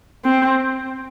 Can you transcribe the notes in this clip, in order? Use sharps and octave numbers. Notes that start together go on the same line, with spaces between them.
C4